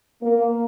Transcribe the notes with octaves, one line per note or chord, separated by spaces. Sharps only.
A#3